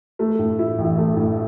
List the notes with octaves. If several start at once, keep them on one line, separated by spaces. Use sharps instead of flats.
A3
A2
E4
A1
A3
A2